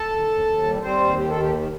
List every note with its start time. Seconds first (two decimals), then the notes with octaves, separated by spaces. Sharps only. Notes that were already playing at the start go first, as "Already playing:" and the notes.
Already playing: A4 A5
0.09 D#2
0.28 D#2
0.45 D#2
0.63 G3
0.81 G3 C4 C5
1.00 D#2
1.17 D#3 G4
1.29 A4
1.36 D#2 G4
1.53 D#3